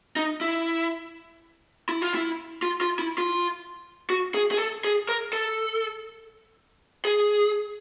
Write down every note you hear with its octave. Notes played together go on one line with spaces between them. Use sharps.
D#4
E4
E4
F4
E4
F4
F4
E4
F4
F#4
G#4
G#4
A4
G#4
A#4
A4
G#4